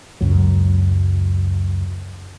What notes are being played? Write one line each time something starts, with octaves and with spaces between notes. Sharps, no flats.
C#2 F#2 F#3